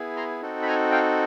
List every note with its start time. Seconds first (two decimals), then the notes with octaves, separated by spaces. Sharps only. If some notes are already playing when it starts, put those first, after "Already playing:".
Already playing: B3 E4 G#4
0.16 A#5 C6
0.42 C4 D#4 F#4 A4
0.62 B5
0.67 G#5 A#5
0.91 F5 G5